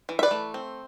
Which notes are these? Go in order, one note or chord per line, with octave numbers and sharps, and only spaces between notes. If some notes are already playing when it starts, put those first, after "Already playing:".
E3
E5
B4 D5
A3
C4